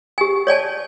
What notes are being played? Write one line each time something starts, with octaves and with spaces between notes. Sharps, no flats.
G4 G#5
C#5 D5 G#5 A5